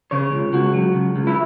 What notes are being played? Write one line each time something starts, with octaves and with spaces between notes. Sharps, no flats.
C#3 C#5
C#2
C#2 F#4
F#3
C#3
C#2
E4